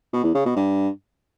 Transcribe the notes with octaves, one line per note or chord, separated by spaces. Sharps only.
B2
E2
C#3
B2
G2